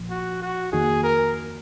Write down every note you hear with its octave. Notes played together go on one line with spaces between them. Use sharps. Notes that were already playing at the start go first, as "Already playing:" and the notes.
Already playing: A#1 A#2 F3
F#4
F#4
F2 D#3 A#3 D#4 F#4 G#4
A#4